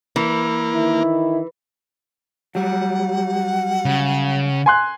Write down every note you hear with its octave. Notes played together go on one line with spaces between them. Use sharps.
E3 A#3
D#3 E4
F#3 G3 F#5
C#3
G#5 C6 F#6